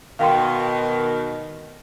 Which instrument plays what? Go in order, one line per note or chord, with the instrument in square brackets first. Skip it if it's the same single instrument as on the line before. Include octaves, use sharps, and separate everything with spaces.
[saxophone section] B2 D#3 [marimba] F5 G5 C6